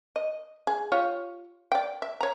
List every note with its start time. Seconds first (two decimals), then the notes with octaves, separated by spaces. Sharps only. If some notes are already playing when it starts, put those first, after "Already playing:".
0.16 D#5
0.67 G#4
0.92 F4 G4 C#5
1.72 D5 G5
2.02 E5
2.21 C#5 A#5